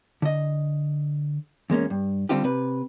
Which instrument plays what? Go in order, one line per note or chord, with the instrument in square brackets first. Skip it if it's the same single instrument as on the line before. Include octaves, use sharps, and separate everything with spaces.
[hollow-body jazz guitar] D3 D#5
E2 G#3 A#3 C#4
G2
D3 G3 C4 D4 F4 G4
C3 B4